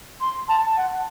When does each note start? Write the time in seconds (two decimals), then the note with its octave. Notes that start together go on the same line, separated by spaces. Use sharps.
0.20 C6
0.48 A5
0.77 F#5